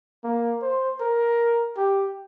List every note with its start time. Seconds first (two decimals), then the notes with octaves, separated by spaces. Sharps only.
0.24 A#3
0.62 C5
1.00 A#4
1.77 G4